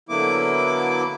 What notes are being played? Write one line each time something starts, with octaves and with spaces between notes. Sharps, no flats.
D3 F#3 A#3 B3 E4 D6